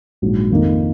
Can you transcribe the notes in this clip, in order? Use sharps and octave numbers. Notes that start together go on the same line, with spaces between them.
A#1 G#2 F#3
F2 D#3 A#3 D#4